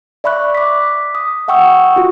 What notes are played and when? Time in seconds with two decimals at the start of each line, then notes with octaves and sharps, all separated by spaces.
0.24 D5 E5 B5 C#6 F#6
0.55 D6 B6
1.15 D#6
1.48 E5 F#5 G5 C#6 D#6 E6
1.96 F4 F#4